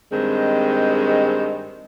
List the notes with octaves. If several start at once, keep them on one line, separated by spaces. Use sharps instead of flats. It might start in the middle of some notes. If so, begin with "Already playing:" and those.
G2 D#3 G#3 C4